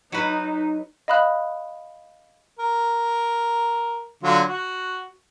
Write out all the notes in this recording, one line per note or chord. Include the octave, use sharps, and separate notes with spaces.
F#3 D#4 B4
D#5 F5 B5 D#6 F#6
A#4
D3 F#3 F4
F#4